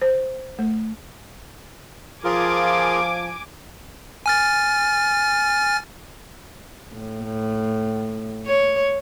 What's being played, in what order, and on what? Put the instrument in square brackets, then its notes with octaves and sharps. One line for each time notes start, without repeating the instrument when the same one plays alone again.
[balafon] C5
A3
[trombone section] F3 [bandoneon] F4 G#4 A#4 [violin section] G#5 D6
[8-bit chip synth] G#5 F6 A6
[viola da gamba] A2
C#5